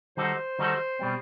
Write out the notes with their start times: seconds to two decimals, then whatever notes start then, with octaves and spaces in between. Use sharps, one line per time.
0.17 D#3 G3 D#4 F#4 A4 C5
0.59 D#3 G3 D#4 F#4 A4
0.99 B2 G3 C4